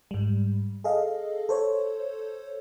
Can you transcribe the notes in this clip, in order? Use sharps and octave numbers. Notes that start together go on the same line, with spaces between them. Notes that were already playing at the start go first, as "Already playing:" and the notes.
G#2 G3
G#4 A4 D#5 F5
A4 C5 C#5